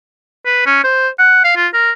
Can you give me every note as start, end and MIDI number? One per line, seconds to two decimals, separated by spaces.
0.45 0.62 71
0.66 0.79 61
0.84 1.09 72
1.19 1.42 78
1.44 1.52 77
1.56 1.67 65
1.74 1.91 70